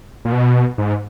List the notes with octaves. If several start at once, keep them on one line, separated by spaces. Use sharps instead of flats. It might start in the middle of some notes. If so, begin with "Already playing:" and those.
A#2
B2
G#2